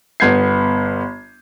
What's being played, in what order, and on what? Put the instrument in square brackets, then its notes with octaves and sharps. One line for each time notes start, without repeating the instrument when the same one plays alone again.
[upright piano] G1 B3 G6 G#6 C7